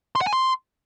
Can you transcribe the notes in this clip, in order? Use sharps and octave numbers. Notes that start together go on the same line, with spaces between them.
C6
F#5
G#5
C6